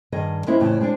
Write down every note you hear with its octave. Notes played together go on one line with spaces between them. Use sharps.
G2 D#3 G#4 D#5
G#3 A#3 C#4 D#4 E4 C5
F2 A2 C#3 E3 E4
G#3 C4 D4